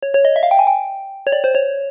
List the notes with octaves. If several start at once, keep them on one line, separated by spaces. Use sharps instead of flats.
C#5
C#5
D#5
E5
F5
G5
G#5
G5
C#5
D5
C5
C#5